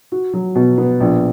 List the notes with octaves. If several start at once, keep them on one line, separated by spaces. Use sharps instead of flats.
F#4
F#3
B2
B3
A#1